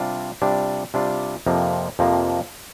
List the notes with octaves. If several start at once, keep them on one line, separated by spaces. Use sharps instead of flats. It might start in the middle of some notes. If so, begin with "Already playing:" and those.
Already playing: C3 G3 D4 F4
C3 G3 D4 F4
C3 G3 D4 F4
F2 C3 F3 A#3
F2 C3 F3 A#3